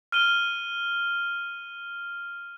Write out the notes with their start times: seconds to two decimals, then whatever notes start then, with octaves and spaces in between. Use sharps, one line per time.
0.12 F6 D#7 G7